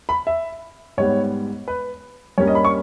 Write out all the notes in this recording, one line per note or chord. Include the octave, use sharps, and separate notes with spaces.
B5
E5
G#2 G3 B3 C#5
B4
G2 G3 A#3 C#4 C#5
D#5
B5
C#6